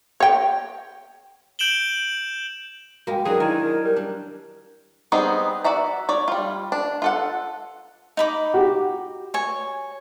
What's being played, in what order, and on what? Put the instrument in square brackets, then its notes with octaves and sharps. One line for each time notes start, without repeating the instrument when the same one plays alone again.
[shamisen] C#5 G5
[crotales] G6 D7 E7 F#7 G7
[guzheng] G#3 A#3 [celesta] F#4 G5
[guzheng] F#3 D4 [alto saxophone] G#4 [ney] A#4
[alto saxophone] D#3 [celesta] E4 A#5 G#6 [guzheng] G#5
[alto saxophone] G3
[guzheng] D4
[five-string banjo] G3 B3 C4 D#4 G#4
F#4 D5 E5 A#5
C#5 D5
G3 F4
D4
F4 A4 F#5
[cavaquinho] D#4 B5 D6
[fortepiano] F#4 G4
[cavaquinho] C#5 G#5